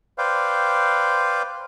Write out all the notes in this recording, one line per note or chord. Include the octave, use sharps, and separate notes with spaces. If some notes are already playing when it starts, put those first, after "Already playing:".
B4 C5 D5 F5 G5